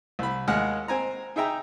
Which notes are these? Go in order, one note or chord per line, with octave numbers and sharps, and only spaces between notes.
C2 B5
D#2 G#3 F#5 F6
C4 G#5 A#5
D#4 G#4 E5 G5 A#5